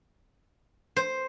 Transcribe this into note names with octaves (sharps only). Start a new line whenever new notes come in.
C5